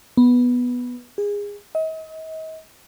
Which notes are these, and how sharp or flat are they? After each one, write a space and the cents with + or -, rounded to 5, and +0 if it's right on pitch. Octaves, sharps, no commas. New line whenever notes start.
B3 -5
G#4 -25
D#5 +40